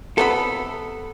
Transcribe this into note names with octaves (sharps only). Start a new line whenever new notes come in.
C3 B3 A4 B5